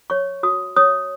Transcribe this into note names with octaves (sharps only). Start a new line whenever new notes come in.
C#5 C#6
F#4 D#6
C#5 D#6